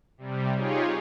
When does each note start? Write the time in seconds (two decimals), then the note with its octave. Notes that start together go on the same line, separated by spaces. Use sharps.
0.18 C3 G3
0.55 D#4 F4 G4 G#4 C#5